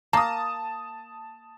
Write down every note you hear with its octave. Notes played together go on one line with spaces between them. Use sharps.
A#3 A5 D#6